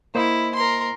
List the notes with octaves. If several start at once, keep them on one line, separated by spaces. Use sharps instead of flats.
A#3 E4 C5 D#5
A#4 C6